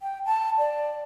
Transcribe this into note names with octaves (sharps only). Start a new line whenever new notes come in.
G5
A5
D5